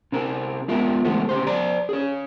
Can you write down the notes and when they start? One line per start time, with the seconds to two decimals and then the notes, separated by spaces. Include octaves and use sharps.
0.12 C3 C4 A#4
0.68 G#3 B3 F4 A#4 E5
1.05 C#3 E3 G#3 A3 B3 C4
1.29 C#3 G4 C5
1.47 C5 D5 A#5
1.89 G#4 C#5